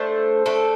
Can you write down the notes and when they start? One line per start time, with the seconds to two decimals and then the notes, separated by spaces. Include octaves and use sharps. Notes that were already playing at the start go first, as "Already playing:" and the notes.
Already playing: A3 D4 A4 C5
0.46 A3 D4 A4